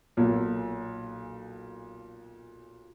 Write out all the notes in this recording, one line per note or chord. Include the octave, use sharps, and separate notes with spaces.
B1 A#2